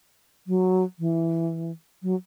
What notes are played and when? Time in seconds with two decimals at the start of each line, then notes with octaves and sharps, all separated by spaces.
0.47 F#3
0.99 E3
2.02 F#3